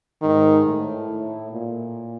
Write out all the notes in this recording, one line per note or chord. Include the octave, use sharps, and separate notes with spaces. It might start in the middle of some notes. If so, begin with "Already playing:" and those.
G#2 D#3
A2
A#2